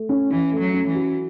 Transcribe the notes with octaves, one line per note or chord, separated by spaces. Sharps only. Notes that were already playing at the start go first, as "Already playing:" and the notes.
Already playing: A3
C#4
E3 C#4
A3
F#3
C#4
E3
F#4